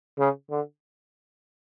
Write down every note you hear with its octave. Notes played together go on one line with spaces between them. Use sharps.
C#3
D3